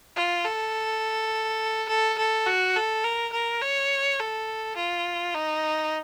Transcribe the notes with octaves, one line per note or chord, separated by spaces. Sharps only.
F4
A4
A4
A4
F#4
A4
A#4
A#4
C#5
A4
F4
D#4